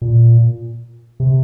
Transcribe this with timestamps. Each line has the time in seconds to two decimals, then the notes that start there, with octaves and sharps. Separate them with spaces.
0.02 A#2
1.20 C3